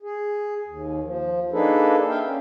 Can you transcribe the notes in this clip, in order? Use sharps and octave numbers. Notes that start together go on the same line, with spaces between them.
G#4
D#2
F3
A#3 D4 D#4 G#4 A4 B4
E5 F5 G5
C#4